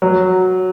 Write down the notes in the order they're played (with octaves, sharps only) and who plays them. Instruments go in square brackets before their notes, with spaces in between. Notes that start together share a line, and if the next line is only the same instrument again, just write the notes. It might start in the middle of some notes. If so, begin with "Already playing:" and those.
[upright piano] F#3